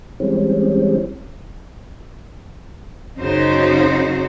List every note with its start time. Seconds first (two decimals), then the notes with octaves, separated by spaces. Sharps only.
0.20 E3 G3 G#3 C4 C#4
3.18 F#2 C#3 D#4 F#4 C5